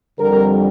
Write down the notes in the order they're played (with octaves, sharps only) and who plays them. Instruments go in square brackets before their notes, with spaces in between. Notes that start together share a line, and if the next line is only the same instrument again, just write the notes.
[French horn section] F2 D3 G3 A#4